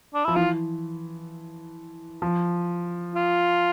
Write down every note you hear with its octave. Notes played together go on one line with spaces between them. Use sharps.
D4
F3 E4
E3 F4
F3
F4